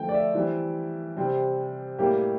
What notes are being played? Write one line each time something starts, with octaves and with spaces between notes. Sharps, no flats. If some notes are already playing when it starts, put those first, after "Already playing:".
Already playing: D3 F3 A3 G5
D5
E5
E3 G3 C4
C3 G3 C4
A2 G3 A#3 G4